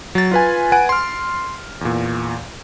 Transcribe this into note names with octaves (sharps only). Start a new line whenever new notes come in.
F#3 A6
F4 B4 G#5
B4 F#5 G#5 D7
C6 F6
E2 A#2